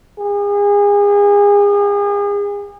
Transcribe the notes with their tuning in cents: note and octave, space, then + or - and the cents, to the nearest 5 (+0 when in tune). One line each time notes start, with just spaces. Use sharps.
G#4 -35